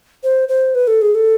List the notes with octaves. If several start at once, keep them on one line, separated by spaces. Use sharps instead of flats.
C5
C5
B4
A4
G#4
A4